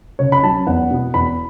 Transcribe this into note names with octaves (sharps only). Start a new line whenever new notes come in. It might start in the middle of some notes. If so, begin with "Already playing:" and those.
C#3 C#5
B5
F#3 C#4 A5
E2 F#5
B2 B3
E2 B5